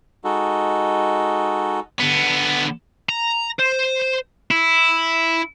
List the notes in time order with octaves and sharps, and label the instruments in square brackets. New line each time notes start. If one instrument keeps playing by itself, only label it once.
[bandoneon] G#3 D#4 F#4 A4
[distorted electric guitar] D3 B3
A#5
C5
E4